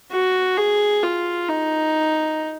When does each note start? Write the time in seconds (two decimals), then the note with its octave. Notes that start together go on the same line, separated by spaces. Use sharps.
0.11 F#4
0.57 G#4
1.03 F4
1.49 D#4